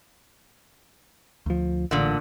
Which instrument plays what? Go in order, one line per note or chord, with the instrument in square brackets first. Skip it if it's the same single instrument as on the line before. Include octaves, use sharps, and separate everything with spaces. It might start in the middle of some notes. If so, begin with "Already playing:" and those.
[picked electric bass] D2 F3
[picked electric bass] A1 [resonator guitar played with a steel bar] A#2 D3